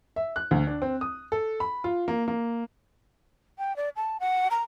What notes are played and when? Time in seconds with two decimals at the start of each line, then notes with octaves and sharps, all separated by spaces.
0.16 E5
0.36 F#6
0.51 D2
0.67 D4
0.82 C4
1.01 D#6
1.32 A4
1.60 B5
1.84 F4
2.08 A#3
2.28 A#3
3.58 G5
3.76 D5
3.96 A5
4.20 F#5
4.51 A#5